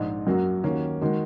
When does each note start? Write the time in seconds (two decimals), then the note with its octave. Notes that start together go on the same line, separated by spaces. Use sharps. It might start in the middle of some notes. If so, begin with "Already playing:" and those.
Already playing: A#1 G#2 G#3 D#4
0.27 F#2 F#3 A#3 F#4
0.63 D#2 D#3 A#3 C#4 F#4
1.01 D#3 G#3 F#4